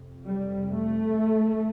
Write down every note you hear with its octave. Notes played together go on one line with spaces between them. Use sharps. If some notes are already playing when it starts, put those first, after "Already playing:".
Already playing: F2 C3
G3
A3